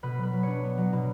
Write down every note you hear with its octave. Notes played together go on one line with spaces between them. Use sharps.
B2 B4
F#3 B4
F#3
D4 C#5
B3
F#3
B2